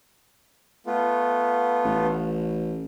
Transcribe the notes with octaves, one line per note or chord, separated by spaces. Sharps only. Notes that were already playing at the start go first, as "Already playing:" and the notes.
A3 B3 F4
A1